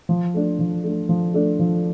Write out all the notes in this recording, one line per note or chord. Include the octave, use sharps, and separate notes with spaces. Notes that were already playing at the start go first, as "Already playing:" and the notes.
F3
A3 D4
F3
A3 D4
F3
A3 D4
F3